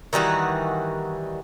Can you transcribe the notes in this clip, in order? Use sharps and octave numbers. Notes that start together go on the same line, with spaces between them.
D#3 E3 G3 F#4